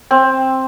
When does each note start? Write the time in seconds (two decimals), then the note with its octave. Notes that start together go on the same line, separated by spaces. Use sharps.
0.11 C4